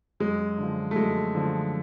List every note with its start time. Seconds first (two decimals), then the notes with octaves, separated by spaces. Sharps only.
0.20 F#2 G#3
0.58 D3 F3
0.91 A3
0.95 F#2 G#3
1.35 D3 F3